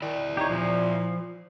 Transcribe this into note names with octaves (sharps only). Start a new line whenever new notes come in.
D#3 E4 D5
D#4 G4 C#5
A#2 F3